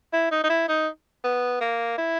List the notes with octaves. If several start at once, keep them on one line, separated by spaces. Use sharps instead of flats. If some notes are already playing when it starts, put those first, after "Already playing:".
E4
D#4
D#4
E4
D#4
B3
A#3
E4